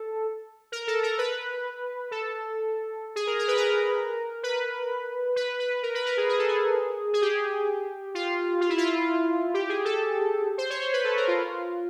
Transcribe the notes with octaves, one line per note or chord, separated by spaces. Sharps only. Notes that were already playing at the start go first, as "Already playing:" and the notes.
Already playing: A4
A#4
A4
A#4
B4
A4
G#4
A#4
A#4
B4
A#4
B4
B4
B4
A#4
B4
A#4
G#4
G#4
A4
G#4
G#4
G4
F4
F4
E4
F4
G4
G#4
A4
C5
C#5
C5
B4
A4
A#4
F4